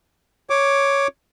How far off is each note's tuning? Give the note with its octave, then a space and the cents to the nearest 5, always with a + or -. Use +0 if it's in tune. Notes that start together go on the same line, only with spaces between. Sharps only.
C#5 +0 D6 +0